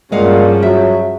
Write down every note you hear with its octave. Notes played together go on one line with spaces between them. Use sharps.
G2 A#2 C#3 F3 G#3 F5 F#5
F#3 E5